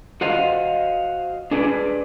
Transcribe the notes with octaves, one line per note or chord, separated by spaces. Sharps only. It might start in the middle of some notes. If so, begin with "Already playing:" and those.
F#4 C5 D#5 F5 F#5
D4 G#4 B4 D5